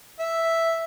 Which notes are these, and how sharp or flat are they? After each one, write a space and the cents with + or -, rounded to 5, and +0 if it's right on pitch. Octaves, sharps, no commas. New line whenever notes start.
E5 +0